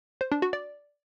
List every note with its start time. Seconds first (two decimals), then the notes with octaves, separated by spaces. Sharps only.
0.21 C5
0.32 D4
0.42 F#4
0.53 D5